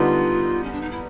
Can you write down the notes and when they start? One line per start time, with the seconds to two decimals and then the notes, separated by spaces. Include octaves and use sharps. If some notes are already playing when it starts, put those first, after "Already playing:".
Already playing: D3 G3 B3 D#4 F4
0.63 C#4
0.72 D4
0.81 D#4
0.90 E4